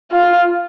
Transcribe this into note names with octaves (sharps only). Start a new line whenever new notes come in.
F4